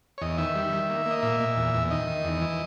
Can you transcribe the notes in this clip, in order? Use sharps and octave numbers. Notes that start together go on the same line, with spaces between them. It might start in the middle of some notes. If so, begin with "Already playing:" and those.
C#5
E2 D#5
D#3 E5
G3
D#3
A#3
A#3 D#5
A#2 E5
A#2
E2
E2
D#3 D#5
D#3
E2
E3